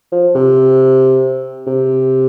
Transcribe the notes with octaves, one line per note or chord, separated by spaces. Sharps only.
F3
C3
C3